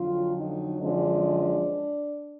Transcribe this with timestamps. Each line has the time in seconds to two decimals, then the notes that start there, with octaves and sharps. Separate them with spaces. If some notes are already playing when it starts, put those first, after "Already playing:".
Already playing: F2 D3 F#3 F4
0.35 D#4
0.80 F#2 D3 F3 G#3 D4